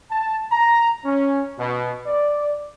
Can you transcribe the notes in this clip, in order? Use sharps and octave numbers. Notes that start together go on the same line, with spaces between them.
A5
A#5
C#4
B2
D5